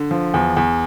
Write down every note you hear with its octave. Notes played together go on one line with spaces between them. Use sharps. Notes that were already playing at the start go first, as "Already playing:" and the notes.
Already playing: D3
F3
E2
E2